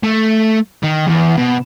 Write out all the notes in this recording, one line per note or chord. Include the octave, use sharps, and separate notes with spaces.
A3
D#3
E2
B2